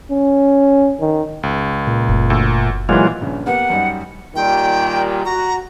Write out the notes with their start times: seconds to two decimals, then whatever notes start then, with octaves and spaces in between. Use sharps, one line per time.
0.11 C#4
1.01 D#3
1.43 C#2
1.87 A#2
2.09 F#1
2.30 D2 E6
2.89 A#2 E3 F#3 G#3 F4
3.21 A#1 G2 C#3
3.46 A#3 B3 G4 F#5
3.70 F#2 G3 D#4
4.36 A#2 D#3 G3 G5
5.25 F#4 A#5